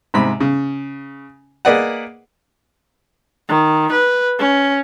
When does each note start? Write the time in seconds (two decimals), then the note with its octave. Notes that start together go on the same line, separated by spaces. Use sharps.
0.14 G#2 C3 B5
0.40 C#3
1.65 A#3 G#4 B4 D5 D#5 F#5
3.49 D#3
3.92 B4
4.39 C#4